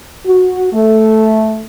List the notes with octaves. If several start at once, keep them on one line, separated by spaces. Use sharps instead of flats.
F#4
A3